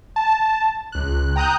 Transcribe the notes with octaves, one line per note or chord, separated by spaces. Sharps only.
A5
C#2 F#6
G5 A#5 D#6 F#6 G6